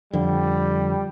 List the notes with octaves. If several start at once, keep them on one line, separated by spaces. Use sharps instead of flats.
F2 D3 G3